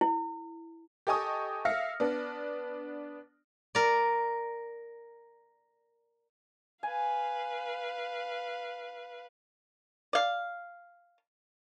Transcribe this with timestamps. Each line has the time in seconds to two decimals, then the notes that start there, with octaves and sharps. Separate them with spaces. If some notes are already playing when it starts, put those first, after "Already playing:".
0.01 E4
1.07 G4 A4 D#5 G#5 C#6 D#6
1.65 E5 F5 F6 A#6 C#7
2.00 B3 D4
3.75 A#4 D5
6.83 B4 F5 G#5
10.13 D5 F5